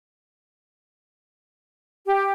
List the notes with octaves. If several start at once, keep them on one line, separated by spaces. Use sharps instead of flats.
G4